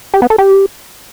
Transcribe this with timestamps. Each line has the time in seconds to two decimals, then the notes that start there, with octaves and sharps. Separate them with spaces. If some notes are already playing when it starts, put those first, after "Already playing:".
0.14 G4
0.22 B3
0.30 A4
0.38 G4